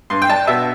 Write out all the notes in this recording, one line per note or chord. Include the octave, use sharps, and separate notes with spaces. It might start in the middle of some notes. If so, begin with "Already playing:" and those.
G2 C6
G5
D4 A5
B2 E5